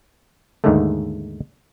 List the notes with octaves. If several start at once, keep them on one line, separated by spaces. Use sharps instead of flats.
D#2 G#2 D3 D#3 G#3 A3